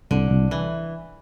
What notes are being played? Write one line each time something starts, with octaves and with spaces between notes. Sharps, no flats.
C2 D3
C2
E3